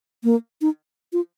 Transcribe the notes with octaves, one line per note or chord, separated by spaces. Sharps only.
A#3
D#4
F4